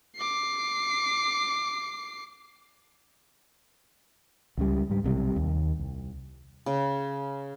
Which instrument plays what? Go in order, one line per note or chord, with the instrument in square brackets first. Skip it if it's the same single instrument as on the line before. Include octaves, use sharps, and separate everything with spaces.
[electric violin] D6 C7
[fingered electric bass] C#2 C#3 G3
G#2 G3
B1 C3 G3
D#2
C2
[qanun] C#3